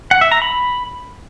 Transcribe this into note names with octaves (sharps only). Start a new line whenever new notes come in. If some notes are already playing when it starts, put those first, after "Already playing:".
F#5
E5
A#5
B5